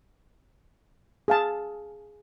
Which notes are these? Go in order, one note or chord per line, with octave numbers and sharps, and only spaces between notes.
G#4 F5 A5